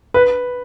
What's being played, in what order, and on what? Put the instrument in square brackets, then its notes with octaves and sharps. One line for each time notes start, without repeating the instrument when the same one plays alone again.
[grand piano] B4